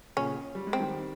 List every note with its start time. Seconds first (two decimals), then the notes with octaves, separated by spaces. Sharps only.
0.17 A#2 C#3 C#4
0.55 G3
0.67 G#3
0.73 C4
0.79 D#3 G3